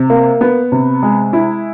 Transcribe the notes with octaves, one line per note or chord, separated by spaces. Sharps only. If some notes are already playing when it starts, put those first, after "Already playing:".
Already playing: C3
A#3
B3
C3
G#3
E4